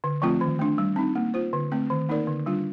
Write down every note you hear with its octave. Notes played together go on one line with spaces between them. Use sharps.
D3
F3 A3 C4 F4
D#3
A3 D4
G3
C4 D#4
A#3
F4 C5
D3
A3 C4
D#3
A#3 D#4 A#4 D5
D3
G3 D4 F4